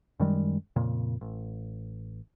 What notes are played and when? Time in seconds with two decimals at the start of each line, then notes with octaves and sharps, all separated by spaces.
0.20 F#2 D#3 G3 G#3
0.76 F2 A#2 C#3
1.21 A1